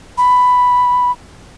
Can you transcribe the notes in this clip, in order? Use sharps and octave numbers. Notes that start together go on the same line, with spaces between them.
B5